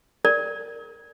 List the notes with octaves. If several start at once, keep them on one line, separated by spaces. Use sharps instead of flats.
A#4 D5